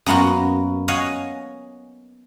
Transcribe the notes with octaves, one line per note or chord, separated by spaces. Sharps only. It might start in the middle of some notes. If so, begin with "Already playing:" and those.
F#2 A#3 B3 F4 F#4
C#5 D#5 F5 F#5 G#5